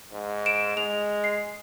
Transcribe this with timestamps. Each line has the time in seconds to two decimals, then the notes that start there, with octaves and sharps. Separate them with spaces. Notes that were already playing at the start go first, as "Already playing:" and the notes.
0.12 G#2
0.46 D7 E7
0.77 G#3 F7
1.24 C7